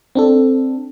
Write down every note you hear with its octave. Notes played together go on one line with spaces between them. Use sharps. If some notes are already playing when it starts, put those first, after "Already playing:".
C4 D4 A4